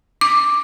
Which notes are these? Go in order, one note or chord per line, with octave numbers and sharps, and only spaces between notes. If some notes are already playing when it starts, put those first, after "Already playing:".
D6